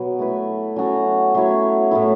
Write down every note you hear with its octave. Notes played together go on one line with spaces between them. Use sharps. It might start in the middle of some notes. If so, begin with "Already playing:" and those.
Already playing: B2 F#3 B3
A3 E4 B4
F#3 C#4 F#4 A4
F#3 A3 E4 C#5
A2 A3 E4